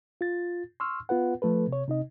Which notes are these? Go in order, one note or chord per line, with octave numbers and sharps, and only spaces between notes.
F4 A6
C6 C#6 E6 F6
B3 F4 B4 F#5
F3 A3 A4 B4
C3 C#5
C3 D#4 D#5